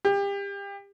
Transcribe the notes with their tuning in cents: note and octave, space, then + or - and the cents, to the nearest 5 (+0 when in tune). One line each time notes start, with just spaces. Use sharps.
G4 +30